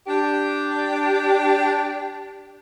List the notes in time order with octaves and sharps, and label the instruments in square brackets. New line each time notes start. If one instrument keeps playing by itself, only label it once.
[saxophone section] D4 G4